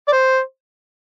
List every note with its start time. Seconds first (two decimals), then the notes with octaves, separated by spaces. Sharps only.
0.08 D5
0.12 C5